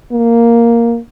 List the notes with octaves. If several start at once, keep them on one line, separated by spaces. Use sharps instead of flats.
A#3